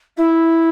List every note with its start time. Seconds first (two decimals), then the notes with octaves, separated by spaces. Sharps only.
0.17 E4